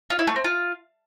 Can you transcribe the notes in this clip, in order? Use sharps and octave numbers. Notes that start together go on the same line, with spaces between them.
F4
E4
A3
C4
F4